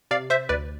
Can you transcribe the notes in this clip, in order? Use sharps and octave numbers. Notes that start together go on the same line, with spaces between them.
C3 D5 F5
C5 E5
D2 B4 D5